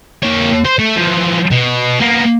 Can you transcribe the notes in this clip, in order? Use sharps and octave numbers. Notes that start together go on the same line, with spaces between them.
A#3 C#5
C5
A3
E3 F3
B2
A#3 B3